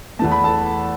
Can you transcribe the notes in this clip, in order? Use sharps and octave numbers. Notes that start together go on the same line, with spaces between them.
E2 E3 A3 A5
B5
A4 A5